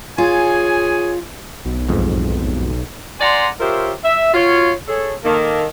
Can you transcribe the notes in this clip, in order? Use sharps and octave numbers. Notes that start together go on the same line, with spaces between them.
F4 G#4 C#5 G#5
B1
A1 F2 G#2
D5 F#5 G#5 A#5 C6
F4 G4 A#4 C5 C#5 E5
E5
F4 F#4 C#5
G#4 A4 C#5
D#3 A#3 A4